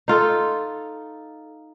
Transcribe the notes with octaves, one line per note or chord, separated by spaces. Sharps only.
D#4 F4 A4